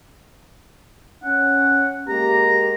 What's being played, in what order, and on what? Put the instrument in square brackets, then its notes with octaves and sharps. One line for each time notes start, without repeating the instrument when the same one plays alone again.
[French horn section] C#4 [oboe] F#5
[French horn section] G#3 A#3 G4 [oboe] A#5